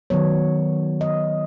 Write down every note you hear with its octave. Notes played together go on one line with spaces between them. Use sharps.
D#3 F#3 B3 C#5
D#5